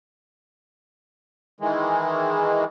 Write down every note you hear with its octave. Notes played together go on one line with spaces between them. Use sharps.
D#3 E3 G#3